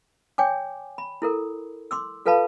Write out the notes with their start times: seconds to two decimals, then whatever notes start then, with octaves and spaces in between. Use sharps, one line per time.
0.38 C#5 G5 G#5 D6
0.98 B5
1.22 E4 A4 A#4
1.91 C6 D6 E6
2.26 F4 A4 B4 F5 A5 B5